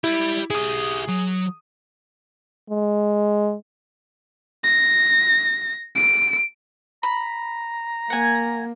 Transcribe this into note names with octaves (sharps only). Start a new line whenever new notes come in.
E4 G4 B5
E4 G4 G#4 D#6
F#3
G#3
A#6
D7
A#5 B5
A#3 F#5 G#5